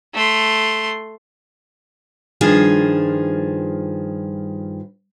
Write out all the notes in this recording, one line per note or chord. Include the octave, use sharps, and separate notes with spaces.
A3 C6
G2 D#3 F3 F4 G#4